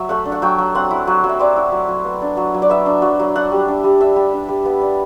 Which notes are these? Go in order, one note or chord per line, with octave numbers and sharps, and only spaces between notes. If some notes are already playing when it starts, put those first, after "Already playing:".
Already playing: F#3 E5
A3 F#5
D4
F#5
F#3 G5
F#3
C4 F#5
E4
F#3
F#3
E5
C4 D5
E4
F#3
F#3
B3
D4
F#3
F#3
D5
B3 E5
D4
F#3
F#3
D4 F#5
G3
D4
G3
D4 E5
G3
D4
G3
B3
D4